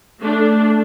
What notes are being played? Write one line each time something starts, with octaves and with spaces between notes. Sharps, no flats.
A3 D4